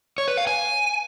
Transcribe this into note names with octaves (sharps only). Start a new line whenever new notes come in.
C#5
B4
F5
G#5